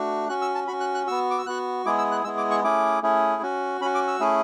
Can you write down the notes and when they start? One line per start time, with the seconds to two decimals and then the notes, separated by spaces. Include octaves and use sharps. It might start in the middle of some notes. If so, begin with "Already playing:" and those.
Already playing: A3 D4 F#4
0.29 C#4 F#4 F#6
0.42 E6
0.55 A5
0.67 C#4 F#4 B5
0.80 F#6
0.95 F#6
1.07 B3 F#4 E6
1.31 D6
1.39 E6
1.46 B3 F#4 F#6
1.86 G#3 B3 E4 G#4 D6
1.98 E6
2.12 F#6
2.24 G#3 B3 E4 G#4 E6
2.37 D6
2.51 C#6
2.64 A3 C#4 E4 G#4 D6
3.02 A3 C#4 E4 G#4
3.42 C#4 F#4
3.81 C#4 B5
3.85 F#4
3.95 D6
4.08 E6
4.20 A3 C#4 E4 G#4